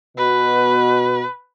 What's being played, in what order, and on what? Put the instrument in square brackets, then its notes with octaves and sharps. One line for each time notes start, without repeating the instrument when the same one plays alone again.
[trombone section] B2 [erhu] B4